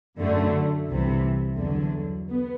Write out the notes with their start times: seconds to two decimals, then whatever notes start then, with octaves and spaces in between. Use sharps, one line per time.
0.18 F#2 D3 A3
0.88 C2 C3 E3
1.58 E2 D3 F#3
2.27 B3